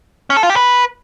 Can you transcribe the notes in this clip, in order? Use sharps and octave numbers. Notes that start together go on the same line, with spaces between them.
C#4
A4
F4
G4
B4